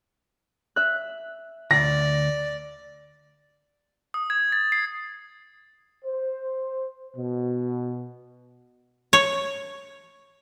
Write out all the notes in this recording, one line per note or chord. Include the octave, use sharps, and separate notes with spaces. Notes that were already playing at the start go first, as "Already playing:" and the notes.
E5 F#6
D2 D5 A#6
D#6
G#6
A6
C7
C5
B2
C#5